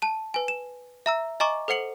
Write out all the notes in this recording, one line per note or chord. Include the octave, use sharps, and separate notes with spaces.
A5 D#7
B4 G#5
E7
E5 A#5 E6
D#5 G#5 A#5 C#6 D6
A4 C5 F#5 C#7 F#7